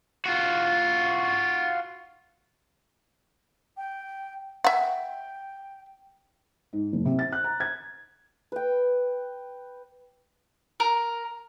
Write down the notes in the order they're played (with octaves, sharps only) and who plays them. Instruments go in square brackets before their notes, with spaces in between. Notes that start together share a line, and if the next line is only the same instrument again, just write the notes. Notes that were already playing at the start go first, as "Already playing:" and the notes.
[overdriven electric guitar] F4 F#4
[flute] G5
[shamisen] E5 F#5 [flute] G5
[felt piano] G#2
F#1
C3
A6
F#6
A#5
G#6
[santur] B4 G5
[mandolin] A#4